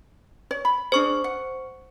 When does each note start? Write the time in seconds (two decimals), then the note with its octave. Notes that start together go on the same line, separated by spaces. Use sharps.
0.51 C#5
0.65 B5
0.92 D4 G#4 C5 C#6
1.24 F#5